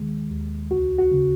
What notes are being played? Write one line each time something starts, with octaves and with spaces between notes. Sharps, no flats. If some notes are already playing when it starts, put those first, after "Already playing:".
Already playing: D#2 D#3 G#3
D#2
C#2 F#4
F#4
C#3